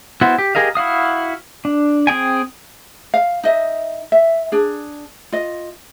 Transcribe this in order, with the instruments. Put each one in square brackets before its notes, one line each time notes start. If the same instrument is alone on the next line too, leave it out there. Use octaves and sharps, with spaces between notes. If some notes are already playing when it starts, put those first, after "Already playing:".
[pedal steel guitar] B3 E4 F#4 C5
G4
G4 G#4 A#4 D#5 F5
E4 F#4 F5 D#6
D4
C4 G#4 G5 G#5
[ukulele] F5
D#4 D#5 E5
E5
D4 G#4
F4 D#5